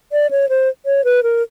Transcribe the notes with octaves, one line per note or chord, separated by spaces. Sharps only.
D5
C#5
C5
C#5
B4
A#4